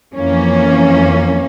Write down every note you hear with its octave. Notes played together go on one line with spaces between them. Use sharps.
F2 E3 A#3 C#4